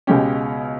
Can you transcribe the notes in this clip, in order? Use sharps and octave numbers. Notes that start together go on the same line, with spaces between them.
C#2 B2 G#3 C#4 G4